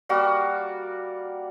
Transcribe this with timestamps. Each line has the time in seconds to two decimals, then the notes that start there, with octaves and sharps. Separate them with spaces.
0.09 G3 A#3 F#4